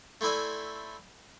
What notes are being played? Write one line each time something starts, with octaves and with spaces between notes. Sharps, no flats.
A3 C4 E4 D5 G#5